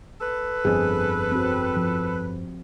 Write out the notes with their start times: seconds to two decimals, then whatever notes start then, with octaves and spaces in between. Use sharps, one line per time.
0.21 A4 B4
0.65 G1 F2 G#4
1.32 C4 F#4
1.76 F3